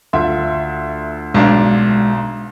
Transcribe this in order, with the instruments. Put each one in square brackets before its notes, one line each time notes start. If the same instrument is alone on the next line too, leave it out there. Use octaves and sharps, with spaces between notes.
[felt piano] D2 F4 E5
[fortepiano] B1 D4 F5 [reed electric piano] G#3